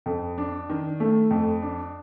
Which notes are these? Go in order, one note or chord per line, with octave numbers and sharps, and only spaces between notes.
F2
D4
D#3
A3
F2
D4